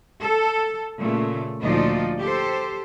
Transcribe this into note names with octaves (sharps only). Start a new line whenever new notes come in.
A4
A#2 C#3 A3
D2 A#2 F3 D#4 F4 D5
G4 A4 C5